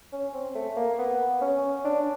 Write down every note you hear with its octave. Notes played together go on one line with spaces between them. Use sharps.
C#4
C4
A3
A#3
B3
C#4
D4